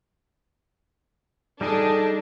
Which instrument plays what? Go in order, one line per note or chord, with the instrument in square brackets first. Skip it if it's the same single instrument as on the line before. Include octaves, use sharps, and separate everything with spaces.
[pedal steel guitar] G3 D#4 G#4 [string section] D4 [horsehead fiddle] A4